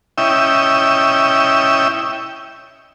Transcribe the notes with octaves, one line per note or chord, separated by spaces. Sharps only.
C#4 E4 D#5 E5 G5